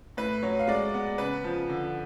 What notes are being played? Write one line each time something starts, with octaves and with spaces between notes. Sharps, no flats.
A2 B4
F#3 C#5
F5
G#3 D5
B3
C#3 B4
F3
D3